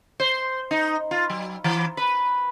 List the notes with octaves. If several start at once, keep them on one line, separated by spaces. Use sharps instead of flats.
C5
D#4
F4
F#3
E3
B4